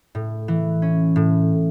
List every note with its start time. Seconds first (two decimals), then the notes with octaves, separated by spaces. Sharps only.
0.15 A2
0.48 E3
0.82 C#4
1.16 A2